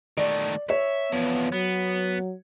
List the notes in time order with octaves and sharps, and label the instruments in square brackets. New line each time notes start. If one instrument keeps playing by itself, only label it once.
[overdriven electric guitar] D#3 A3 [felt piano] D5
[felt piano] C#5 [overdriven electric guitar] E5
[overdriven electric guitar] E2 F3 [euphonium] B3
[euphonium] F#3 [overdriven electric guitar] B3